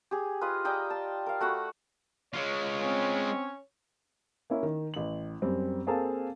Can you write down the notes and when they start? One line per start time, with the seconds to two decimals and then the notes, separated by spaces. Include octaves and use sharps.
0.11 G4 G#4
0.41 F4 B4 D#5
0.65 D5 D#5 G5 A#5
0.90 A5
1.26 A#4 F5
1.40 A3 F#4 F#5 B5
2.34 G#3 F4 C#5
2.82 C4 C#4
4.50 A#3 C#4 E4
4.63 D#3
4.94 A1 F#7
5.42 F#2 G3 C4
5.87 A#3 C4 G#4 A4 F5 A5